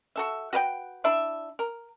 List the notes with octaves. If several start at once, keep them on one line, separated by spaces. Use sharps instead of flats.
F#4 A4 E5
F#4 B4 F5 G5
D4 E4 E5
A#4